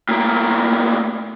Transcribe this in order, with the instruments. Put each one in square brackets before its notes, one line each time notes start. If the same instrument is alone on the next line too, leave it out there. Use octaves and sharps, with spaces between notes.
[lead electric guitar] A2 A#3